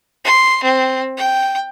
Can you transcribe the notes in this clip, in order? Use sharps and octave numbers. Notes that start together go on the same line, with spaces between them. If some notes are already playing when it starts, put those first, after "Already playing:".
C6
C4
G5